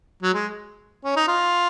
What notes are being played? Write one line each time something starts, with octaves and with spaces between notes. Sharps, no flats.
F#3
G#3
C#4
D#4
F4